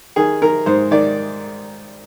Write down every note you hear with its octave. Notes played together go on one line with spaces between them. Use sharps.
D#3 G#4
D#3 A#4
G#2 C5
D#3 D5